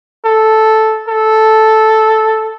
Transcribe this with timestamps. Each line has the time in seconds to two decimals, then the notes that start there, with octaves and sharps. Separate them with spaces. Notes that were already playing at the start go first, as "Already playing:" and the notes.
0.25 A4
1.08 A4